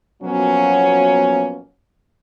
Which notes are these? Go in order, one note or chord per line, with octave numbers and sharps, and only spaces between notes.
B2 F3 F#3 A#3 B3 C#4